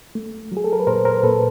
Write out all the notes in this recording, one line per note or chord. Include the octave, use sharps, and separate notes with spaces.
A3
F#3
G#4
A4
A#4
B4
A#2 A#4 C5
A#4 C5
A#2 A4 B4